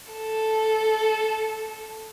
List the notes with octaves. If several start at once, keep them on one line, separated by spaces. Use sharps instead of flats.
A4